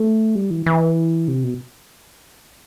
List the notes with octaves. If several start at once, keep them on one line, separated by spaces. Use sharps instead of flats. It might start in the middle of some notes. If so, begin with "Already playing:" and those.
Already playing: A3
G3
E3
E3
C3
B2